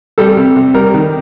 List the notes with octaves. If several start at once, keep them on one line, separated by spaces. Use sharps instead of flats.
G3 A4
C3
C3
G3 A#4
D#3